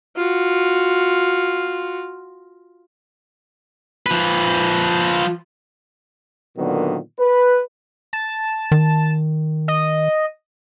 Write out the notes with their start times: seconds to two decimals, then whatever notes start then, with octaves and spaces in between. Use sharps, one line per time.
0.16 F4 F#4
4.06 F3 B4
6.57 A#2 D3 D#3 F#3 B3
7.19 B4
8.13 A5
8.72 D#3
9.68 D#5